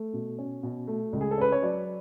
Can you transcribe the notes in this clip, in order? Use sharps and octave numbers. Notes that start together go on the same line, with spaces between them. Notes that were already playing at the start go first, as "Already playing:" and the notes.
Already playing: A3
B2
C#4
B2
A3
C#2
G#4
A4
C#4 B4
C#5
F#3 D5